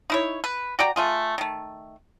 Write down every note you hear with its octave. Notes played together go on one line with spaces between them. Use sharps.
D#4 E4 C#5
B4
F#4 D5 G5 A#5
A3 F4 G#4
D#3 A3